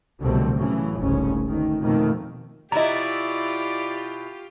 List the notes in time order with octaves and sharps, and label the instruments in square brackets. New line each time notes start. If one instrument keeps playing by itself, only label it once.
[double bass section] C2 B2 D3 F#3 A3 C4
A2 C#3 E3 F#3
F1 C2 G#2 C#3 C#4
D2 D#3 A3
F2 B2 D#3 A3 A#3
[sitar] B2 E4 [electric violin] F4 G4 [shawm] D5 [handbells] D#5 A#5